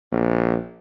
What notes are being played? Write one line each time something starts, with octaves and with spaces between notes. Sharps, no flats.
A#1